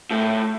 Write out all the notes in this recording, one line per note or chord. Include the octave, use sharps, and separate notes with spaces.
A2